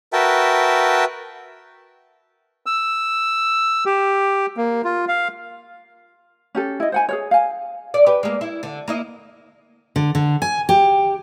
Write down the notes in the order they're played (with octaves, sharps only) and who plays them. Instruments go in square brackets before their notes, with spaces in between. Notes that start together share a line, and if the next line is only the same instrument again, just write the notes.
[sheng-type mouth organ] F#4 A#4 B4 E5 G5 A5
[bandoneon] E6
G4
A#3
F4
F5
[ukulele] C#4 G4 A4
E4 D#5
C5 F#5 G#5
G#4 A#4 C#5
F5 G#5
[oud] D5
G4 B4
G#3 A#3
E4
D3
A#3 E4 D#5
[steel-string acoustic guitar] D3
D3
G#5
G4